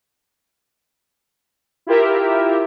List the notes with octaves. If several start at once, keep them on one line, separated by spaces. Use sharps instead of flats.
E4 F4 G4 A#4 E5